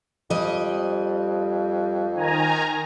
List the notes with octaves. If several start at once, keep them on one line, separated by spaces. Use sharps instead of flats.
F2 G3 D#5
D#3 G#5 A#5